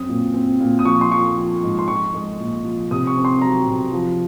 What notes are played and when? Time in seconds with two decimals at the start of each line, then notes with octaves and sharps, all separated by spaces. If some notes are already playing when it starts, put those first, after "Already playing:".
Already playing: F#2 C4 D#6
0.09 A#2
0.34 C4
0.60 A#2
0.79 D#6
0.85 F3 C#6
1.01 C6
1.11 F3 C#6
1.37 F3
1.63 G#2
1.79 C6
1.88 F3 C#6
2.14 G#3
2.40 A#2
2.64 F3
2.91 C3 D#6
3.07 C#6
3.17 C4
3.25 C6
3.42 F#3 A#5
3.67 C3
3.93 F3